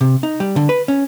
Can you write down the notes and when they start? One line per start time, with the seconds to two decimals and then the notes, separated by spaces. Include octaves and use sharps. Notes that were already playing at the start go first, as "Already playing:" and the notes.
0.01 C3
0.23 D#4
0.40 G3
0.56 D3
0.69 B4
0.88 C#4